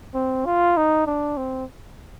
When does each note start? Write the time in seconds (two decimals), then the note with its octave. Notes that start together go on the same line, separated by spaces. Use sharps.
0.14 C4
0.45 F4
0.77 D#4
1.07 D4
1.37 C4